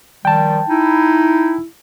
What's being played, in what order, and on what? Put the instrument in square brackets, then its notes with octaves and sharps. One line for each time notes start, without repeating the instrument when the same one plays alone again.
[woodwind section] D#3 F3 G3 [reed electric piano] G5 A5
[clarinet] D#4 [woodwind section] E4